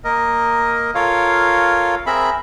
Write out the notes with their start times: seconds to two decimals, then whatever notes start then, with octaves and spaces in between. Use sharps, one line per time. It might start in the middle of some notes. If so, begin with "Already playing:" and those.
0.04 A#3 A#4 D#5
0.95 F4 A4 A#4 C#5 F5
2.06 C4 G#4 A#4 E5 B5